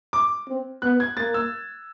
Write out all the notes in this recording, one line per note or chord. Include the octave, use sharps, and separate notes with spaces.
D6
C4
B3 F#6
G#6
A#3 A6
E6